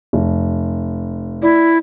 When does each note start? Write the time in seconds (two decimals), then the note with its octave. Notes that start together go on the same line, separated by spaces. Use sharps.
0.13 F1
1.42 E4 D5